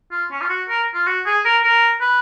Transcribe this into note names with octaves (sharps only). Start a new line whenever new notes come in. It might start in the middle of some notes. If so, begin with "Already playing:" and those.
F4
C#4
F4
F#4
A#4
F4
F#4
G#4
A#4
A#4
B4